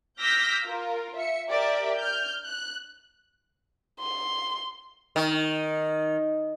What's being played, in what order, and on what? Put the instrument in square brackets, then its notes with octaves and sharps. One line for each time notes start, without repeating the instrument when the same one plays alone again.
[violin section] D6 E6 F6 G6 A#6 B6
F4 A#4
E5 C#7
G4 A#4 D5 E5
F6 G6
F#6
[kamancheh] C6
[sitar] D#3